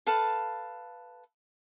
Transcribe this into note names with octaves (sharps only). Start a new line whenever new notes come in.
A4 B4 F5 A5